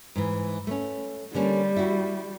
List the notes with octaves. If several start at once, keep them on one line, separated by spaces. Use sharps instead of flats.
G#2 E3
A3 C#4
D3 G3 A#3 C#4
E4 F#4